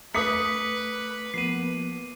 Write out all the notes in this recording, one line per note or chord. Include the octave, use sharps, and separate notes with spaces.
A3 B4 D6 D#6 B6 C#7
F3 A#3 B3 C7 D#7